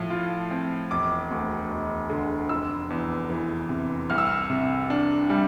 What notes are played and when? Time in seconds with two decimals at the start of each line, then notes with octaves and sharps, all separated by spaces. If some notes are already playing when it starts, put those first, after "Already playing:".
Already playing: A2 F3
0.10 F4
0.51 C4
0.91 E1 D6
1.31 D2
1.70 E1
2.10 D3
2.49 F1 E6
2.90 E2
3.30 E3
3.69 C3
4.10 C2 F6
4.18 E6
4.27 F6
4.50 C3
4.90 D4
5.30 G3